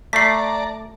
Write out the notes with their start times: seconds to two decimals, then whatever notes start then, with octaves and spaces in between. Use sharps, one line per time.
0.13 A3 D5 A5 A#5 B6 C7